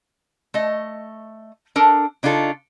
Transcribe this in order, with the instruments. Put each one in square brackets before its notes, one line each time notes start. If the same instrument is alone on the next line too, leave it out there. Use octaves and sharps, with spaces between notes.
[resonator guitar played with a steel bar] A3 D#5
D4 A4 A#4
C#3 D4 D#4 F4 A4